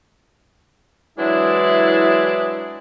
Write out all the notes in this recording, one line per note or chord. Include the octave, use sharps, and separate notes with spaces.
E3 F#3 G#3 D4 E4 G#4